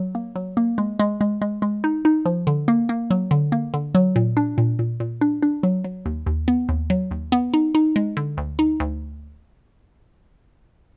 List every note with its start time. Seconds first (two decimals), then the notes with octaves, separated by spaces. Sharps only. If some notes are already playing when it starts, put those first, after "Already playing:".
Already playing: F#3
0.15 A#3
0.36 F#3
0.57 A#3
0.78 G#3
0.99 G#3
1.21 G#3
1.42 G#3
1.62 G#3
1.84 D#4
2.05 D#4
2.25 F3
2.47 D3
2.68 A#3
2.89 A#3
3.11 F#3
3.31 D3
3.52 A#3
3.74 D3
3.95 F#3
4.16 A#2
4.37 D4
4.58 A#2
4.79 A#2
5.00 A#2
5.21 D4
5.42 D4
5.63 F#3
5.84 F#3
6.06 D#2
6.26 D#2
6.48 B3
6.69 D#2
6.90 F#3
7.11 D#2
7.32 B3
7.54 D#4
7.75 D#4
7.96 G#3
8.17 D3
8.37 D2
8.59 D#4
8.80 D2